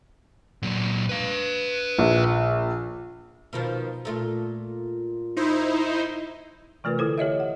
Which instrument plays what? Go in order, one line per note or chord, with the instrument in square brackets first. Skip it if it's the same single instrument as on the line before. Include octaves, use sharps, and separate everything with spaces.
[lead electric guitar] A#2 F#3
B4 F5
[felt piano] A#1
[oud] B2 D#3 F3
A#2 A3 F4
[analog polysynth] D#4 E4 C5
[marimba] C3 E3 A3 F4 A#4 B4
D3 A3 E4 A4 C5
G4 C#5 D#5 E5
F#5